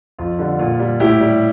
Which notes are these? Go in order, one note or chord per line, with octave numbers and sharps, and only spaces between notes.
F2 F4
D3 G3
A#2 F4
G3
A2 E4 G4
G3